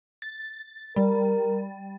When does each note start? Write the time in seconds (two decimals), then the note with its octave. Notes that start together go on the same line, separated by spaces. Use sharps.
0.22 A6
0.96 G3 A#4